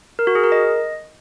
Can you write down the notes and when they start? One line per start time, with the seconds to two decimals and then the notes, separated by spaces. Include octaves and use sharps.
0.19 A#4
0.27 F#4
0.35 G#4
0.44 A#4
0.52 D#5